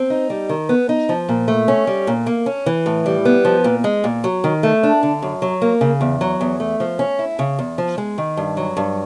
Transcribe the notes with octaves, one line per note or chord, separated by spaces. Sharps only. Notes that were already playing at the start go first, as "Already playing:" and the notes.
Already playing: C4
D#4
G3
D#3
B3
D#4
F3
A#2
A3
C#4
G3
A#2
A#3
C#4
E3
A2
G3
B3
F3
A#2
G#3
A#2
F#3
D#3
A3
D4
D3
F#2
F#3
A#3
C#3
E2
F#3
E2
A3
F3
C#4
E4
C#3
E2
F3
G#3
D#3
G2
F#3
G2